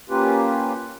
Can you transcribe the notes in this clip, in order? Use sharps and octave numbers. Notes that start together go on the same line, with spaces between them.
A#3 C#4 F4 G4 B4